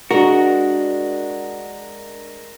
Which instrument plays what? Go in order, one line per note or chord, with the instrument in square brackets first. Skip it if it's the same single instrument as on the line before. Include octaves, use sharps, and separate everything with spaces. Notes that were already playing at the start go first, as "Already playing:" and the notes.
[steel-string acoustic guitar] G#3 D4 [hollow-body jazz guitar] F#4 [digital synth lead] A#4